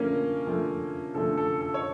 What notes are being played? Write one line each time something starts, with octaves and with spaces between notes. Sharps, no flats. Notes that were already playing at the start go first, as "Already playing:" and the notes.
Already playing: D3 F3 A3 A#3 C#4 A#4
D3 F3 A3
D3 F3 A3 A4
A4
A4
C#5